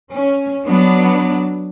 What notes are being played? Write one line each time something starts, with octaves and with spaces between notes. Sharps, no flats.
C#4
F#3 B3 D4